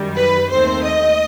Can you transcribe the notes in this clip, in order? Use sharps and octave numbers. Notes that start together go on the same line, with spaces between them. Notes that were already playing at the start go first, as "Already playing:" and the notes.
Already playing: F#2 D#3 G3
B4
D#2 D#3 A3 C4 C5
D#5